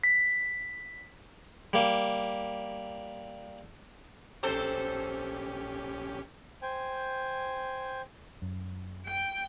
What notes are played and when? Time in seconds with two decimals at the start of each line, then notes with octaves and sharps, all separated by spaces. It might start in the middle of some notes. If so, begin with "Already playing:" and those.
0.04 B6
1.73 G3 A#3
4.43 A#1 C4 C#4 G4 A4 C5
6.62 C5 G5 G#5
8.42 F#2
9.06 G5